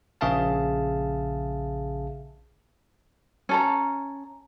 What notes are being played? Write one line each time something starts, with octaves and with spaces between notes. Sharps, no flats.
A#1 C#3 G#4 E5 F5 A5
C#4 A4 A#5